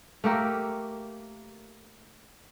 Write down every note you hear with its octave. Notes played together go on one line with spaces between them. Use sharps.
A3 A#3 G4 A#4